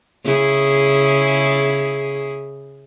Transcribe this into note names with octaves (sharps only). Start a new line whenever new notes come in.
C#3 E4 G#4